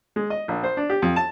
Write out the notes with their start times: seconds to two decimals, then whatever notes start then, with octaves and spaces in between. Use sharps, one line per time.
0.16 G#3
0.30 D#5
0.48 A#1
0.64 C5
0.77 D4
0.90 G4
1.02 F2
1.16 A5